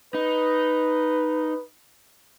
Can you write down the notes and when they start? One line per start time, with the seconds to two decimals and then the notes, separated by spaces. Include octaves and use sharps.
0.15 D#4 B4